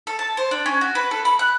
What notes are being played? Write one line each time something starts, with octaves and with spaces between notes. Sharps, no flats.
A4
A5
C5
D4
C#4
F#4
B4
A4
B5
F#6